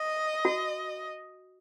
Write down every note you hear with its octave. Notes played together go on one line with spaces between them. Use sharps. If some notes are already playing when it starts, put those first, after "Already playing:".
Already playing: D#5
F#4